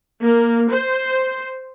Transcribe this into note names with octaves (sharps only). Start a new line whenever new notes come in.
A#3
C5